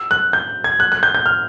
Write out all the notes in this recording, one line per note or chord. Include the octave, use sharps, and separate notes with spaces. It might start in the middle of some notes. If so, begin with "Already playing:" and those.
Already playing: E6
F#6
G6
G#6
F#6
F#6
G6
G6
F6